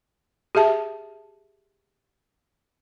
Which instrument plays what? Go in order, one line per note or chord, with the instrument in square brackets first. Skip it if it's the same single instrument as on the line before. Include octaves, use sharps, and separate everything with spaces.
[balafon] G4 G#4 E5 A5